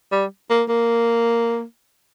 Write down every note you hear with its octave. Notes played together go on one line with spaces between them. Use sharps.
G3
A#3
A#3